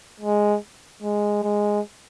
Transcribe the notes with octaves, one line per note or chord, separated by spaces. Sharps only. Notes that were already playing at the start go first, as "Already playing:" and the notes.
G#3
G#3
G#3